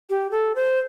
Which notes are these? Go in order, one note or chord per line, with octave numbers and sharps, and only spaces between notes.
G4
A4
C5